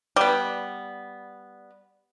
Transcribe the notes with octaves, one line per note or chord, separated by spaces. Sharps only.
G3 B3